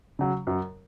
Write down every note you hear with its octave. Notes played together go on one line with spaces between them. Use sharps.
C#3 F#3
F#2